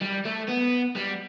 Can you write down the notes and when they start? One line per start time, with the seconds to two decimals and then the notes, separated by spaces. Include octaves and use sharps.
0.01 G3
0.25 A3
0.48 B3
0.96 G3